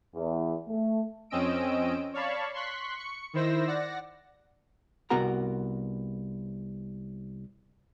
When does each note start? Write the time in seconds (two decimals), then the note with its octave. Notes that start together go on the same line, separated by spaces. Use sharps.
0.15 E2
0.68 A3
1.30 F2 C4 C#4 D#5 E6 D7
2.14 C#5 D5 F5 A5 B5 C#6
2.54 C6 C#6 F#6 B6
2.96 C#6 C#7
3.34 D#3 E4 C5 E6 A#6
3.67 D5 F#5 A#6
5.10 C2 B3 F#4 A#4 F#5 A#5